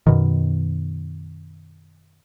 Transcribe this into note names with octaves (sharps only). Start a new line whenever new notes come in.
F#2 B2 D#3